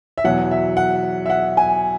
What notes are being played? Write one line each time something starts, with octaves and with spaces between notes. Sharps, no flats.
E5
E2 B2 F#3 F#5
E5
F#5
E5
F#5
G#5